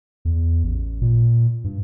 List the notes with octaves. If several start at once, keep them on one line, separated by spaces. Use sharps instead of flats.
E2
A1
A#2
G2